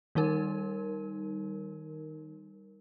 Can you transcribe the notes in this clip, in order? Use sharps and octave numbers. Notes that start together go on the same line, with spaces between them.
D#3 G3 D#4 A#4